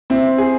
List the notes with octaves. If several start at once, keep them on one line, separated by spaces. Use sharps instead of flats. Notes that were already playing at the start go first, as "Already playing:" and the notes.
C4 E4
G#4